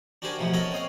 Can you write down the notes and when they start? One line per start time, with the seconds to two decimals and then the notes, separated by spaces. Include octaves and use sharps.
0.22 D4 F#4 G4 A#4 C5 G#5
0.39 A1 F#2 B2 F3 F#3
0.54 C#4 A4 A#4 D#5 F#5 G#5
0.71 C4 C#5 D#5 F5